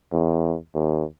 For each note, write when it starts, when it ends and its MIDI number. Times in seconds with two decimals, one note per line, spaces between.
0.12 0.56 40
0.74 1.04 39